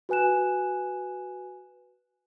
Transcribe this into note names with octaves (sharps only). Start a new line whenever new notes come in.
F#4 B4 G#5 F#6 E7